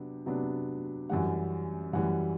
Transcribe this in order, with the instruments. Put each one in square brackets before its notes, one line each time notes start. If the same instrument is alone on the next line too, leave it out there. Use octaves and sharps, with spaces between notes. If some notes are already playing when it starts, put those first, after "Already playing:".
Already playing: [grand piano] C3 F#3 B3 D4
C3 F#3 B3 D4
F#2 E3 G3 F#5
F#2 E3 G3 F#5